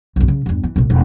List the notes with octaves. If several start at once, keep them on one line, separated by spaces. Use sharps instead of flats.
B1 F#2
C#3 C#4
E2 G2
E3
C2 A#2
E1